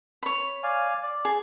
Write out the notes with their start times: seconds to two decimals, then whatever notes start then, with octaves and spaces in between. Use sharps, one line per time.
0.23 C#5 B5
0.63 D5 F5 G#5
1.03 D5
1.25 G#4